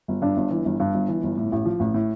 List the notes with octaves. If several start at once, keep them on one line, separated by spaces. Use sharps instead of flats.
G1
G2 D4
G1
E3
G1
G2
G1
E3
G1
A2
A1
F3
A1
A2